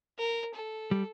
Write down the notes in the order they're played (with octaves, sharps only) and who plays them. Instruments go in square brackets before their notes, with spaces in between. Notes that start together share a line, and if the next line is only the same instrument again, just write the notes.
[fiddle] A#4
A4
[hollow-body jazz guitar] G3